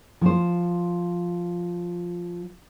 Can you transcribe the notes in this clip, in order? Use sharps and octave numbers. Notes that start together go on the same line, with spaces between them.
F3 C5